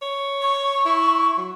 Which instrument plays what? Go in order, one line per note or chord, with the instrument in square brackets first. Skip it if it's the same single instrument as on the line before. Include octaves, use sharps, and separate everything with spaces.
[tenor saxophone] C#5
[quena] C#6
[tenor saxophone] E4
F#3